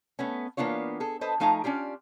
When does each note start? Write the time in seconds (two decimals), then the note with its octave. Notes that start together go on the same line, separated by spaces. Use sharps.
0.19 A3 B3 C#4
0.57 E3 A#3 B3 D4 F4 C#5
1.00 G#4 A4
1.21 A4 B4 C5 D#5
1.40 F3 A3 D#4 F5 G#5 A#5
1.64 C#4 D4 F4 G4